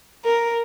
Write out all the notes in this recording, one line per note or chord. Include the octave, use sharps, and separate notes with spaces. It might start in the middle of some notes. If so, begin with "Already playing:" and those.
A#4